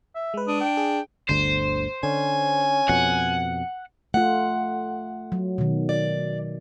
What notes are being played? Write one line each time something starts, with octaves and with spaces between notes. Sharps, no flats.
E5
G#3 B4
D4 D#6
G5
G#4
G1 D2 D3 C5
D3 C#4 G#5
F2 B2 F#5
A3 F4 F#5
F#3
B2 D#3
D5